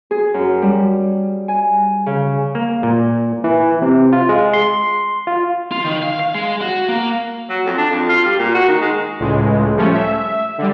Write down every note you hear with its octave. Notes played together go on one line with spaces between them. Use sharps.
G#4
F#2
G3
G#5
C#3
A#3
A#2
E3
C3
F4
G#3
C6
F4
F4
D#3
F5
F5
G#3
F#4
A#3
F#3
F2
D4
F2
F4
G3
A#2
F#4
D#3
G#3
C#2 A2 G#3
F3 G3 A3 C#4
E5
D3 G3